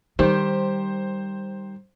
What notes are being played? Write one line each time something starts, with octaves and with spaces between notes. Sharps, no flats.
D#3 G3 G4 C5